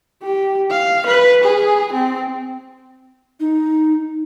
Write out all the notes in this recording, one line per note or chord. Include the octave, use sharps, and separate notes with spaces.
G4
F5
B4
G#4
C4
D#4